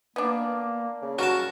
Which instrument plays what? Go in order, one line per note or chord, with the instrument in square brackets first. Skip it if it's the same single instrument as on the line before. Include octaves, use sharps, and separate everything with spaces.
[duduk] A#3 [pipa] B3 D4
[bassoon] C#3
[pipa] F#3 A#4 [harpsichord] F#4 A5